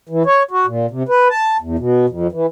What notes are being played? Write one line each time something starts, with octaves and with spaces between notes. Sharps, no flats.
E3
C#5
F#4
A#2
C3
B4
A5
E2
B2
F2
E3